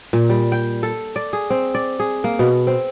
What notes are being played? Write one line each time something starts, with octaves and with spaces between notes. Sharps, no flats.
A#2
G3
G5
A4
D5
G#4
C4
D5
G#4
A#3
B2
C4